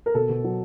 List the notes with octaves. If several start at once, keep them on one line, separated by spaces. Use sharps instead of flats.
A#4
B2 A4
B2
F#3